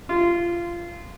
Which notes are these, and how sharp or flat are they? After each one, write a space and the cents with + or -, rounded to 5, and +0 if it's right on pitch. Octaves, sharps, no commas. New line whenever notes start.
F4 -20